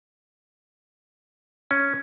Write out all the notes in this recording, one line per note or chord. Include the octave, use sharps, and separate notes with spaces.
C#4